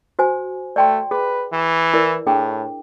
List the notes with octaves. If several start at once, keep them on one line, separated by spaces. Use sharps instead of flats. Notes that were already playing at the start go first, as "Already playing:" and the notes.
F#4 C5 G#5
A3 D5 G5 C6
G#4 B4
E3
E4 A#4 D5
A2 D4 G#4 G5